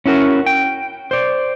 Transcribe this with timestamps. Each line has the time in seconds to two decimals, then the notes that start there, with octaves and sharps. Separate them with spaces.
0.06 C#4 E4 F#4 A#4
0.46 G5
1.11 C5 D5